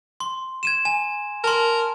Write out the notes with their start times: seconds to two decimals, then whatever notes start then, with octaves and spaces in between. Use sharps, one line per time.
0.20 C6
0.63 G#6 D#7 E7
0.85 G#5
1.44 A#4 A5 C6